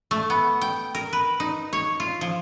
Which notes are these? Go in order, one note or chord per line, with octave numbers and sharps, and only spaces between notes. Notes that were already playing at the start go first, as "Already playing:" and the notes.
A3
B3
G5
A#4
B4
D#4
C#5
F4
F3